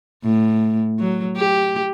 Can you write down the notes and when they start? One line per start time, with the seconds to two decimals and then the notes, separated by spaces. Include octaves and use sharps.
0.24 A2
0.99 F#3
1.37 G4